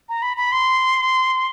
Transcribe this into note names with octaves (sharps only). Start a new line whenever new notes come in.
A#5
B5
B5
C6